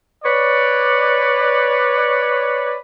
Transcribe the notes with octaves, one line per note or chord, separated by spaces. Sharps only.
B4 C#5 D5